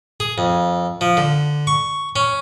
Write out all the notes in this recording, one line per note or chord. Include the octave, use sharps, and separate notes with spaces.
G#4
F2
F3
D3
C#6
C#4